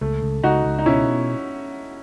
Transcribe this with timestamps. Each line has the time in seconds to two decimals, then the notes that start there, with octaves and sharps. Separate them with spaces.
0.01 C#2 A3
0.23 C#2
0.43 C#2 D#4 F#4
0.65 C#2
0.79 D#4
0.86 B2 C#4 E4